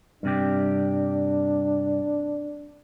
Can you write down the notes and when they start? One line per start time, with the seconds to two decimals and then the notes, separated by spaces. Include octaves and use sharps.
0.23 G2 C3 D4 G4